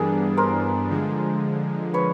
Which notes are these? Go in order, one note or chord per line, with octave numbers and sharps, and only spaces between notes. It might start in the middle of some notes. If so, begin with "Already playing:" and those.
Already playing: G2 E3 G3 B3 D4 G#4 A#4
A#4 C5
D3 F3 G#3
B4 C#5